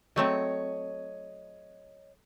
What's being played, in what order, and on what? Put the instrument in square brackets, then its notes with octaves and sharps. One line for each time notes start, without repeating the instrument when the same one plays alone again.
[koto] F#3 A3 C4 [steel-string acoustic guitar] C#5 D#5